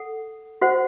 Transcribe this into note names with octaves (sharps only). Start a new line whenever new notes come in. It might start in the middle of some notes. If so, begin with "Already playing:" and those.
Already playing: A4 F#5
F#4 C5 F#5